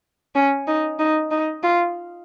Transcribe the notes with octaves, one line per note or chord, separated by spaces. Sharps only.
C#4
D#4
D#4
D#4
F4